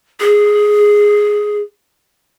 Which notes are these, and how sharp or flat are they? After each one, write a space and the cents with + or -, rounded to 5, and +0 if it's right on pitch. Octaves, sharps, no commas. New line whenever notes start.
G#4 +5